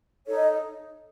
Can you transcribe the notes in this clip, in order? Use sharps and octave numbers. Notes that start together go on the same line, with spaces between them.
D#4 A4 C#5
D#5